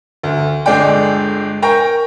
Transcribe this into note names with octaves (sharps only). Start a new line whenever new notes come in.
D2
G1 D3 G#3 D5 G5
A#4 G5 A#5 C#6